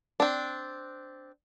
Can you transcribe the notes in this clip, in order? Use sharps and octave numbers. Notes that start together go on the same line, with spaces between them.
C4 D4